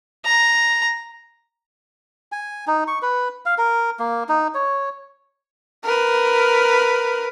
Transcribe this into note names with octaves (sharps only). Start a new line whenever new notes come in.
A#5
G#5
D#4
C#6
B4
F5
A#4
A#3
D#4
C#5
A#4 B4